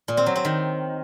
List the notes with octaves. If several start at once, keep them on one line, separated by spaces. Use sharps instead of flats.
A#2
C4
F#3
C4
D#3